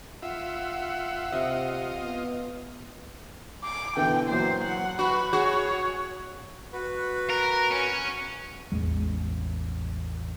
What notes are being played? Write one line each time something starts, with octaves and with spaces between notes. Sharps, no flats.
F4 E5 F#5
C3 F4 D#5 E5
B3
D6
B2 D3 E3 G5
A#2 E3 F#3 C5
F#3 F#5
F#4 B4
F#4 G#4 C#5
F#4 B4
A#4
C#4
A1 E2 G#3